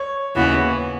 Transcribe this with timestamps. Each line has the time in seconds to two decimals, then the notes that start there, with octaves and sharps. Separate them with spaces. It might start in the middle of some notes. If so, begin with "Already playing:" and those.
Already playing: C#5
0.34 D#2 C#3 E3 B3 F#4